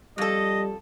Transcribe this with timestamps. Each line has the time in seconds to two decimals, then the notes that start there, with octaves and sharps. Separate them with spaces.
0.18 F2 G3 A4 D#5